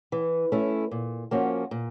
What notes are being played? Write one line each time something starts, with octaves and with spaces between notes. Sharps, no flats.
E3
A3 C#4 E4
A#2
F3 A#3 C#4 F#4
A#2